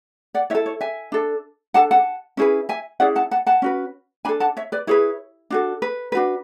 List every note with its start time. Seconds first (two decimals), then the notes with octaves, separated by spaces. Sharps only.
0.34 D5 F#5
0.50 E4 C#5 E5
0.55 A4
0.66 C#5
0.81 E5 G#5
1.12 D4 A4
1.74 D4 A4 F#5 A5
1.91 F#5 A5
2.37 C#4 E4 G#4 B4
2.69 E5 G#5
3.00 C#4 E4 G#4 D5 F#5
3.16 F#5 A5
3.31 F#5 A5
3.46 F#5 A5
3.62 C#4 F#4 B4
4.25 D4 A4 G#5 B5
4.40 F#5 A5
4.57 C#5 E5
4.72 B4 D5
4.87 E4 G#4 B4 C#5
5.50 D4 F#4 A4
5.82 B4
6.12 D4 F#4 B4